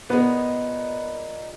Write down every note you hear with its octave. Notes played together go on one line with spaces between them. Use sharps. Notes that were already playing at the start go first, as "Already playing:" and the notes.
A#2 G#3 B3 D#4